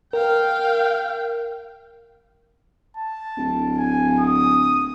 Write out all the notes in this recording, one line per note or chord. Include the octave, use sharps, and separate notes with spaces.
A#4 F5 G5
A5
D1
G#5
D#6